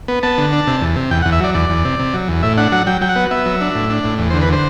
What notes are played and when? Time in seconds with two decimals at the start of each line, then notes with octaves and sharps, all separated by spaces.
0.08 B3
0.23 B3 A5
0.38 D3
0.53 D4
0.67 C3
0.82 E2
0.96 C3
1.11 E2 G5
1.22 F#5
1.26 E2
1.32 E5
1.40 F#3 D5
1.54 E2 D5
1.70 E2
1.85 C3
1.99 C3
2.14 F#3
2.28 E2
2.43 A2 E5
2.57 D4 F#5
2.72 F#3 F#5
2.87 F#3 G5
3.01 F#3 G5
3.09 F#5
3.16 B3
3.31 B3 E5
3.46 F#3
3.61 D4
3.75 A2
3.90 D4
4.04 A2
4.18 E2
4.30 C5
4.34 D3
4.41 B4
4.49 D3 C5